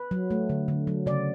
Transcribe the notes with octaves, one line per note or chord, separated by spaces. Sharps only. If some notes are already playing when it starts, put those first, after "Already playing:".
Already playing: B4
F#3
A3
D3
D3
F#3
C#3 D5